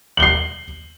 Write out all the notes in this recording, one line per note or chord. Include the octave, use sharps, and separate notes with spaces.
C7 F#7 G7